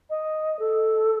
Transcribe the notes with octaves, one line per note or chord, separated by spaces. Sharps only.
D#5
A4